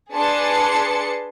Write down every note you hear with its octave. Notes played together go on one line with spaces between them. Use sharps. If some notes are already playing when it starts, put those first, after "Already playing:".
D4 G#4 B4 A5 C6 C#7